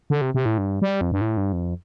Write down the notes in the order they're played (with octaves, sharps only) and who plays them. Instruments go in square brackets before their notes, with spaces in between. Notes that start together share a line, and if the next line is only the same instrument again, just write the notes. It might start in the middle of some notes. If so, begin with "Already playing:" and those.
[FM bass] D3
C3
C3
A2
G2
G3
F2
G2
A2
G2
F2